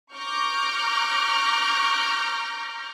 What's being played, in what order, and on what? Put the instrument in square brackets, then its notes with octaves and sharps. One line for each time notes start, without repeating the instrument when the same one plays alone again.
[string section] A#5 C#6 D6 F6 G6 A#6